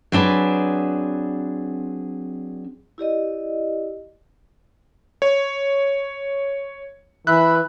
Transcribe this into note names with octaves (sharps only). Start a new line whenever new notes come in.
F#3 C4 D4 G#4 B4
E4 G4 D5 D#5
C#5
E3 B4 E5 F#6